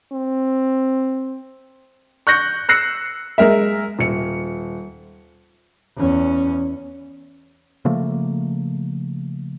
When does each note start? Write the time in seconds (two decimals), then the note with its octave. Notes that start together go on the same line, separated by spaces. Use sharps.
0.12 C4
2.27 C#6 F#6 G6 A#6 C#7
2.69 E6 F#6 A#6 C7 C#7
3.38 G#3 A#4 E5
3.99 D#1 C#7
5.97 E2 C#4
7.85 C#3 F3 A3 A#3